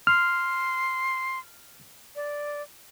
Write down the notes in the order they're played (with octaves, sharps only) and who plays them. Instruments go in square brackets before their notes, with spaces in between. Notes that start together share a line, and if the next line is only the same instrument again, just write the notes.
[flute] C6 [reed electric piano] F6
[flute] D5